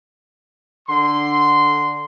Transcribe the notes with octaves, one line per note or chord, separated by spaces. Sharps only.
D3 C6